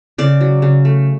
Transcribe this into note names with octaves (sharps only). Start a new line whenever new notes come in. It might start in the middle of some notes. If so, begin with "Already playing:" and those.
C#3 D5
F#3
C#3
A3